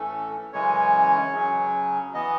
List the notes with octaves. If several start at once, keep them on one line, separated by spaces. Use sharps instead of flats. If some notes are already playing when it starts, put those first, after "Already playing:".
Already playing: A2 E3 A3 C#4 A4
F#2 C#3 E3 G#3 C#4 C#5
C#3 F#3 C#4
E3 B3 D#5